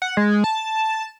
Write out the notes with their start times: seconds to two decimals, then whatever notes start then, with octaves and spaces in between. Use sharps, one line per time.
0.02 F#5
0.17 G#3
0.44 A5